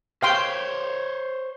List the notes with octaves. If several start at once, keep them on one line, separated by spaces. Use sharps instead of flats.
C5 C#5 F5 G5 C6